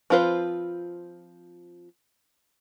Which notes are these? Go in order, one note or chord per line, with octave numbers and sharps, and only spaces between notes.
F3 C4 F4 B4 C5